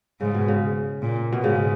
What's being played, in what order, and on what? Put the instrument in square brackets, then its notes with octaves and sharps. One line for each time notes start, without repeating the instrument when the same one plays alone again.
[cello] G#2 [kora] C#3
[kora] B2
C#3
[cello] A#2
[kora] B2
[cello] G#2 [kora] C#3